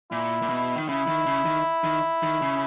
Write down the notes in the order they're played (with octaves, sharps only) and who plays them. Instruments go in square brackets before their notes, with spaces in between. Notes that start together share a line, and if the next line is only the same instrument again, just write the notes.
[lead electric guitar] A#2 [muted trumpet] E4
[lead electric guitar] A#2
B2
D#3
[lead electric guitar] C#3 [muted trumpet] E4
[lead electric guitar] D#3
C#3
D#3
D#3
D#3
C#3